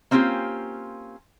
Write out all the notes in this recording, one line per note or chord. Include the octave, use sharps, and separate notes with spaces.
A#3 C4 C#4 F4 G4